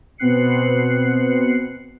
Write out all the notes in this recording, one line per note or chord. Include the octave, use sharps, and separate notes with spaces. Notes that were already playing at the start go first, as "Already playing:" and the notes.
B2 B3 C4 F#6 C7 C#7